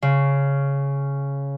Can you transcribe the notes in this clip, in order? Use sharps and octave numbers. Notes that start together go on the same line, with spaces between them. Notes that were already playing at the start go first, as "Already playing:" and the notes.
C#3